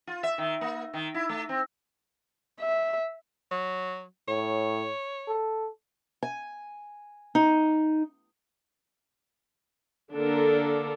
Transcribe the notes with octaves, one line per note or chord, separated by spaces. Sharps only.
F4
E5
D#3
A#3
D#3
E4
A3
C4
E5
F#3
A2 C#5
A4
G#5
D#4
D3 A#3 D4 A4 A#4